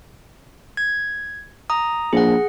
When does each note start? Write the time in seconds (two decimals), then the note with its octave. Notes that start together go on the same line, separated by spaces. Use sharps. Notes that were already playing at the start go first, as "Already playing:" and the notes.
0.77 G#6
1.70 A#5 D#6
2.13 A#1 G#4 F#5